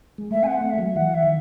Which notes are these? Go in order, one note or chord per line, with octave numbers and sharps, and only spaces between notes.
G#3
A3 E5
C4 F#5 G#5
A3
G#3 E5
F#3
E3 F#5
E5
D#3